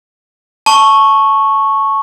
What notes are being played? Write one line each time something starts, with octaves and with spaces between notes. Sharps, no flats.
A5 C#6